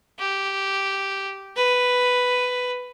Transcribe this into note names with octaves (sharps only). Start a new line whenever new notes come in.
G4
B4